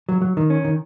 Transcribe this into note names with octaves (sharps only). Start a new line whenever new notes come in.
F#3
F#3
D#3
C#4
D#3